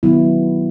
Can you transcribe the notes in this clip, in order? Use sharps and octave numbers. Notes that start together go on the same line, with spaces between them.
D#3 F#3 B3 E4